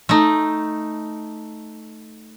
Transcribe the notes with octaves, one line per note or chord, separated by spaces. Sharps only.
A3 D#4